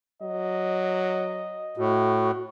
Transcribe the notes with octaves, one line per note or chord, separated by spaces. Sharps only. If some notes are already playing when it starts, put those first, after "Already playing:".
F#3 D#5
A2 F#4